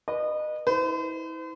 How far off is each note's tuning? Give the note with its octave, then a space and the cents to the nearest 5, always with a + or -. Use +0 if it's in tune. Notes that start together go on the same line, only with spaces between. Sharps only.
B4 -25 D#5 -30
E4 -35 C5 -45